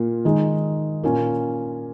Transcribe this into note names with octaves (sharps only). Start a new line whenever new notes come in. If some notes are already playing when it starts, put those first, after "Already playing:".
Already playing: A#2 A#3 F4
D#3 G#3 D#4
A#2 A#3 C#4 F4